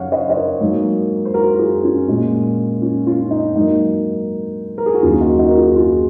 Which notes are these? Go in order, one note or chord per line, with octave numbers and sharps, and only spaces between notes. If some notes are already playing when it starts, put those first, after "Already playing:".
Already playing: F#2 C#3 F#3 C#5 F5 F#5
C5 D#5
D#5
A#4 C#5
G#2 F#3 A#3
C5
F#4 A#4
A#4
F4 G#4
C#4 F4
A#2 G#3
C#4 F4
C#4 F4
C#4
D#4
G#2 F#3 A#3 D#4
A#4
G#4
F#4
D#2 D#3 F#3 C#4 F4
D#4 F#4
D#4 F#4
A#4
F4 G#4
F4 G#4